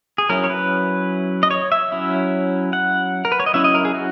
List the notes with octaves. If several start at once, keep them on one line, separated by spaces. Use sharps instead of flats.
G#4
F#3 C#4 E4 A#4
C#5
B4
D#5
C#5
E5
F#3 C#4 E4
F#5
A#4
B4
C#5
D#5
F#3 C#4 E4 E5
D#5
A#4
G#4
F#4